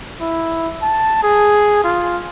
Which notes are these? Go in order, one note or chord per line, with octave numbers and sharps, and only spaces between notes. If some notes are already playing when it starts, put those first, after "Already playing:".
E4
A5
G#4
F4